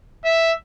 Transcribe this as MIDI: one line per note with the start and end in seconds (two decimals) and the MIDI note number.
0.25 0.53 76